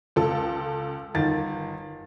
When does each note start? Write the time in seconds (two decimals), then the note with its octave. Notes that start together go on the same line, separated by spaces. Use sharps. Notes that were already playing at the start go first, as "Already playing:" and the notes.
0.16 C#2 A4
1.14 G1 D#3 A6